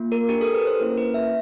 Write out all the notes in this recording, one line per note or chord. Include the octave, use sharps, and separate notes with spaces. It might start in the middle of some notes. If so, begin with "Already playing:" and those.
Already playing: A#3 F4
A#4
D4 G4 A#4
A4
B4
C5
A#3 C#4 E4 A#4
B4
E5